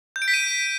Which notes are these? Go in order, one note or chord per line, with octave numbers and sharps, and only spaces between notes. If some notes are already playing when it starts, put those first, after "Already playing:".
G6
D7
B6
D#7